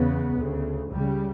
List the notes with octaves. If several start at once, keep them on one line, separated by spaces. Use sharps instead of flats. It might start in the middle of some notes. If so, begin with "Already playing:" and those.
Already playing: E2 C#3 B3
D2 C#3
C#2 C#3 G3